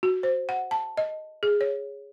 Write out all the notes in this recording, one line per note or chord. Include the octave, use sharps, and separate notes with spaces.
F#4
C5
F#5
A5
D#5
G#4
C#5